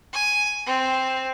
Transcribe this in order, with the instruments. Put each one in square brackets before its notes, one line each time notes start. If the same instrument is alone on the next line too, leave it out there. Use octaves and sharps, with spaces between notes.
[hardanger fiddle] G#5
C4